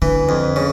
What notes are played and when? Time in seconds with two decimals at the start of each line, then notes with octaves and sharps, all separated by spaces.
0.02 D3 E3
0.29 F2
0.56 C#3